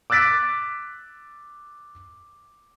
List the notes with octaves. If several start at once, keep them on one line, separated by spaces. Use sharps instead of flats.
D6 E6 F#6 A6 B6 D7